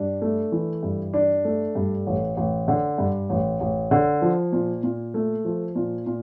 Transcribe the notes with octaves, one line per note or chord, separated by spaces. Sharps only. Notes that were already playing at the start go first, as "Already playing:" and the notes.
Already playing: G2 D4
A3
E3
G2
D4
A3
G2
A1
A1
D3
G2
A1
A1
D3
F3
A#2
A#2
A3
F3
A#2
A#2